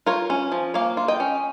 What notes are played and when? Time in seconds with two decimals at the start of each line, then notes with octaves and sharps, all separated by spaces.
0.06 F4 A#4 C#5
0.30 C#4
0.52 F3
0.74 A#3 C#5 F5
0.97 F4
1.08 D#5 G5
1.20 C#4